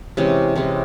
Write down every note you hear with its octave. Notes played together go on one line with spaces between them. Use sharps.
C3 E3 G#3 C#4
C3 E3 G#3 C#4